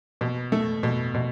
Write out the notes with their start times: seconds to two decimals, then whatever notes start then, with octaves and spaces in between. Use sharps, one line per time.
0.21 B2
0.52 A3
0.83 B2
1.14 B2